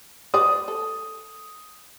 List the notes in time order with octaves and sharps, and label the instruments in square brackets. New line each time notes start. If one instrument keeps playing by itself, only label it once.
[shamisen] B4 C5 D5 [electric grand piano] D#6
[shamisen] A4